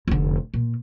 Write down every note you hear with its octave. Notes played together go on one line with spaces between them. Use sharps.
F1 D3
A#2